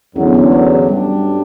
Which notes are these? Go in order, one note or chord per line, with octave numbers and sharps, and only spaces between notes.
E2 D3 F#3 C#4
B3
C#4
A3
G2 F#3 G3 A3 D4 G4